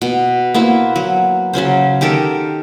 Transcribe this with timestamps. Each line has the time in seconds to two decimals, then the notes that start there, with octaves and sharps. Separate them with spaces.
0.02 B2
0.54 A#3 B3 E4 C5
0.96 F#3
1.53 C#3 F#3 C#4 C5
2.01 D#3 G4 A4 A#4